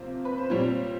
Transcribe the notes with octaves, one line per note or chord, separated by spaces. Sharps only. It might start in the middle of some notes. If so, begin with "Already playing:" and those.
Already playing: C3 F3 A#3 C5
B4
C5
A#2 G3 C4 C#5